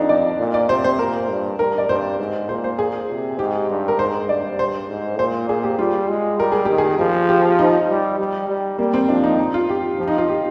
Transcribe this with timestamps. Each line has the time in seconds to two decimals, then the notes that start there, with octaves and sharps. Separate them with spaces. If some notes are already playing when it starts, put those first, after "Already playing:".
Already playing: F2 D4 D#4
0.09 D5
0.39 A#2
0.54 D5
0.69 C3 C5
0.84 C5
0.99 A#2 A#4
1.29 G2
1.59 G2 A#4
1.78 D5
1.89 G2 C5
2.19 G#2
2.49 A#2 C5
2.64 C5
2.79 G#4
3.10 C3
3.38 G#2 G4
3.69 G2
3.88 A#4
3.99 G#2 C5
4.29 G2 D5
4.59 C5
4.88 G#2
5.18 A#2 C5
5.49 A#2 G#4
5.64 G4
5.79 G3 F4
6.09 G#3
6.39 G3 A#4
6.52 G#4
6.65 D#3 G4
6.78 G#4
6.99 F3 G#4
7.29 G4
7.59 D#4
7.89 G3
8.18 G3
8.48 G3
8.78 G3 A#3
8.94 C4
9.09 F3 D4
9.24 D#4
9.39 D#4
9.54 F4
9.69 G4
9.99 F3
10.08 D#4
10.18 F4
10.29 G4